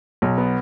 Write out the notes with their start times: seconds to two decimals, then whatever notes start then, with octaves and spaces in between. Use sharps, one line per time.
0.22 B1
0.38 B3